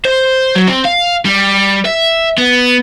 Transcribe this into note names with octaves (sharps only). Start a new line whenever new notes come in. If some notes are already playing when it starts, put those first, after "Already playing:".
C5
F#3
C4
F5
G3
E5
B3